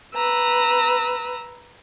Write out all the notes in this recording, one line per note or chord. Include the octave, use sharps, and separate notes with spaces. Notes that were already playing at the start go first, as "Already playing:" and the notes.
B4 A#5 E6